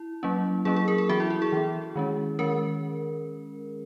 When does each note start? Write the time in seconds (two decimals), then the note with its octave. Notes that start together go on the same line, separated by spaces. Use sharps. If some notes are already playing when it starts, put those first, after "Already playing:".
Already playing: E4
0.23 F#3 A#3 C#4
0.65 F#3 A#3 C#4 G#4
0.76 G#4
0.88 A#4
0.98 G#4
1.09 E3 B3 F#4
1.20 E4
1.30 E4
1.42 G#4
1.52 E3 B3
1.96 D#3 G#3 C#4
2.39 D#3 G#3 C#4 A#4